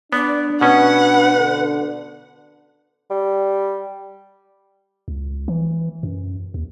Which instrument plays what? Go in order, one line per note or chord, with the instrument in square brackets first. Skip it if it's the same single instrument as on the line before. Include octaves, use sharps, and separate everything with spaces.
[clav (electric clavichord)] B3 [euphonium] D4 [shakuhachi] D5
[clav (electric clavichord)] B2 C#4 [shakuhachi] B4 [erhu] F#5
[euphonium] D3
[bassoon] G3
[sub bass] C#2
E3
F#2
D#2